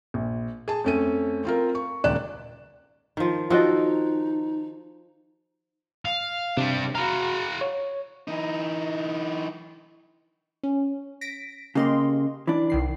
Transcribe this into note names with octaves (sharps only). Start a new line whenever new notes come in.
A#1
G#4 A5
F2 A3 C#4 A4 D#7
C4 F4 A#4
C#6
D#1 C#2 D#3 D5 F#6 E7
D#3 F3
D#3 F3 D#4 F#4 A4 D#5 G5
F5
C3 G3 D4
F#4 F5 A#5 B5
C#5
E3 D#4
C#4
A#6 B6 D7
C#3 A#3 G4 D#5 C6
E3 D4
C2 D#3 C7